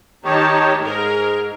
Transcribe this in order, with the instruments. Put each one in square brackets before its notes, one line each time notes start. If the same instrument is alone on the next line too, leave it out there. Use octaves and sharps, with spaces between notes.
[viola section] D#3 A5 [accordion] D#4 G4 C#5
[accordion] G#2 [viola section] G#4 A#4